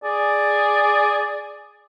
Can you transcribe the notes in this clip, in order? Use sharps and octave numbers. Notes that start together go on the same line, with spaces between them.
G#4 D5